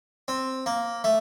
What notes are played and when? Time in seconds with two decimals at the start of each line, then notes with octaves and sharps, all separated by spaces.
0.28 C4
0.66 A#3
1.04 A3